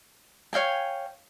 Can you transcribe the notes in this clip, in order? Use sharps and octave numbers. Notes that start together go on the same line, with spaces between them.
C#5 F5 G5 G#5